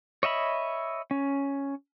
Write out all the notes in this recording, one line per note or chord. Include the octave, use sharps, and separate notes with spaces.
C#5 D#5 E5 B5
C#4